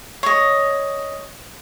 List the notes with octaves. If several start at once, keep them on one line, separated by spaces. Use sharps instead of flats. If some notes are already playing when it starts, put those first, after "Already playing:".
C#5 D#5